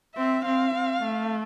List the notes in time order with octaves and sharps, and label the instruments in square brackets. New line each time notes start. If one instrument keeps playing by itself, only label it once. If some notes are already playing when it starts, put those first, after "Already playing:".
[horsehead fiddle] C4 [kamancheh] E5
[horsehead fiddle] C4 [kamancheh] F5
[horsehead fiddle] C4
A3